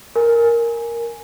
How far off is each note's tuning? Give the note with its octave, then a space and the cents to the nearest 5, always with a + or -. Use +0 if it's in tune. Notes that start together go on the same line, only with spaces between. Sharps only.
A#4 +0 G#5 +0